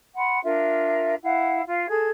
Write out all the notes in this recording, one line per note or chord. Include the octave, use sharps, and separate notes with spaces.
F#5 B5 C6
D4 F4 A#4 E5
E4 F5 F#5
F4 F5
G#4 A4 G#6